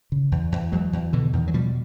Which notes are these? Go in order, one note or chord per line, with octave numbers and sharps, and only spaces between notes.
C#3
E2
E2
E2 F#3 G#3
E2
B2 D3 E3
E2 D#3
F#3
B2 F3 G3